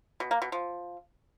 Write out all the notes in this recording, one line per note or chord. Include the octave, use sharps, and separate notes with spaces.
B2
A#3
B2
F3